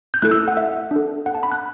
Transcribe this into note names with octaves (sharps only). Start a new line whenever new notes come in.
G6
A3 E4 A4 F#6
E6
F#5
E5
D4 A4
F#5
A5
B5
F#6